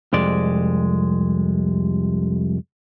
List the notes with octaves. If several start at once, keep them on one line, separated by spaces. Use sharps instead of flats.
C2 F2 G#3 D5